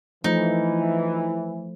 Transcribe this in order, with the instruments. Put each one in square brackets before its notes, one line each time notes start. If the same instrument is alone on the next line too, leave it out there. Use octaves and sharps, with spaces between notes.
[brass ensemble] E3 [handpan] F3 A3 [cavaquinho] D#4